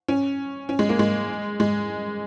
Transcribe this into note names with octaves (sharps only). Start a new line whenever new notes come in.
C#4
C#4
G#3
A#3
G#3
G#3